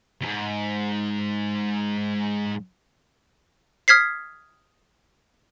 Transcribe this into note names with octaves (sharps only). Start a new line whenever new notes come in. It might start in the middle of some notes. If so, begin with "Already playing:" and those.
D2 G#2
D#6 F6 G#6 B6 C7